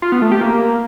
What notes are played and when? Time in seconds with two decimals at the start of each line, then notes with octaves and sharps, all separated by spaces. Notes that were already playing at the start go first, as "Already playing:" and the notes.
0.02 F4
0.12 B3
0.22 A3
0.32 G4
0.41 A#3